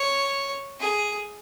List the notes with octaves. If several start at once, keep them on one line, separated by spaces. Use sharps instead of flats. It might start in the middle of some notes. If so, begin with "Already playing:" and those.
Already playing: C#5
G#4